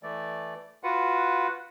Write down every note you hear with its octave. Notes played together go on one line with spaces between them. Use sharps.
E3 A3 D5
F4 F#4 B4 F#5